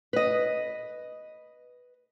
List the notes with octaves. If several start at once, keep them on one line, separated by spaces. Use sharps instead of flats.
B4 D#5